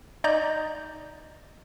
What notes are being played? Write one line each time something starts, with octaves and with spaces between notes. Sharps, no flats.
D#4 D5 D#5 A#5 G6